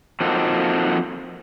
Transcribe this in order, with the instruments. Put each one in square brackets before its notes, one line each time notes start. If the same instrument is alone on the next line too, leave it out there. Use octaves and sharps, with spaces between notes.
[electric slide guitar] F3 A#3 C4 D#4 F#4 A4